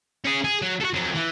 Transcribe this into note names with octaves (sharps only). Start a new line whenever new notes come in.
C#4 G#4
G#4
F#3
F#4 A4
F2 F#3
E3